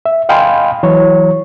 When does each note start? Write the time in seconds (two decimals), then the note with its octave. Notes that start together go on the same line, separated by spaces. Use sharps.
0.06 E5
0.29 D#5 F5 G5 G#5 B5 C6
0.83 E3 F#3 C#5